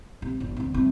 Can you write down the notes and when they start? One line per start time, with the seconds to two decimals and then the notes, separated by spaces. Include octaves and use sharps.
0.22 C3
0.40 G1
0.57 D2 C3
0.74 G2 C3